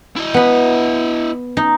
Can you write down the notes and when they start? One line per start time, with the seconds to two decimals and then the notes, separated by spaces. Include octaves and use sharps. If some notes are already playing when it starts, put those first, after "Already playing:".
0.17 E4 D#5
0.34 B3 B5
1.57 D#4